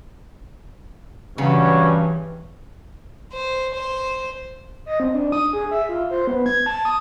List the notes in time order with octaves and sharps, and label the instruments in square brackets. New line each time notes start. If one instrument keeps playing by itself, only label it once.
[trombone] G2 [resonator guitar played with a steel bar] C#3 [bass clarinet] E3 [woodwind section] F#3 C#4
[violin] C5
C5
[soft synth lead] D#5
C4
D4
D#6
G#4
E5
F4
C5
B3
G#6
A5
D#6